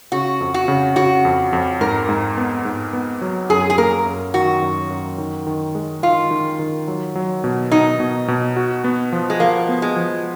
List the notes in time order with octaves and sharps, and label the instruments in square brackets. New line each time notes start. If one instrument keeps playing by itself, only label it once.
[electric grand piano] C#3 [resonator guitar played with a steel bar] F#4
[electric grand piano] F2
[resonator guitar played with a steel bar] F#4
[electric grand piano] C#3
[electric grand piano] C#3 [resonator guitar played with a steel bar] F#4
[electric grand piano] F2
F2
[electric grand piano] G#2 [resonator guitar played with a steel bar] A#4
[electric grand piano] G#2
B3
G#2
B3
F#3
[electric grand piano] F#2 [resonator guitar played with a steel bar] G#4
[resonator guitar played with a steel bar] G#4
[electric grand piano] A#3 [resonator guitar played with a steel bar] A#4
[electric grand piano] F#2
[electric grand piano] D#3 [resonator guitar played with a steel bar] F#4
[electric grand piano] F#2
F#2
D#3
D#3
G#3
[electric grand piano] D#3 [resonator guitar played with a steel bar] F4
[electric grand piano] D#3
D#3
F#3
F#3
B2
[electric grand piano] B2 [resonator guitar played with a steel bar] D#4
[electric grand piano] B2
B2
F#4
B3
F3
[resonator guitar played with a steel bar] G#3
[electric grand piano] F3 [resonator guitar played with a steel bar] A#3
[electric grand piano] B3
[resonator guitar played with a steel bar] G#3
[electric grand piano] F3